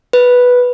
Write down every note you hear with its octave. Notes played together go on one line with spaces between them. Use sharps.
B4